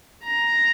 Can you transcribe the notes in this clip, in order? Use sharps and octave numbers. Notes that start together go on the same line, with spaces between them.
A#5